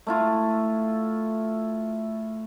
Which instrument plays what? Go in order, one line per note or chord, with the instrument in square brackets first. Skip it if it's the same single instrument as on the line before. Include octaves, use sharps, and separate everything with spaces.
[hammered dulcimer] A3 E4 F4